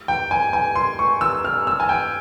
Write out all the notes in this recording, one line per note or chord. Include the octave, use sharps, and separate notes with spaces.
G5
G#5
G#5
C6
C#6
E6
F6
E6
G#5
G5